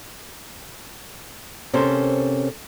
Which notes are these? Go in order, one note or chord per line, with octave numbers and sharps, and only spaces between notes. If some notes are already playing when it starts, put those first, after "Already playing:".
C3 A#3 C#4 A4 C5